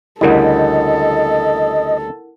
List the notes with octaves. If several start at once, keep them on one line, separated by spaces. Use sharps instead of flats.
D2 C#3 G3 E4 A4 A#4 D#5 F#5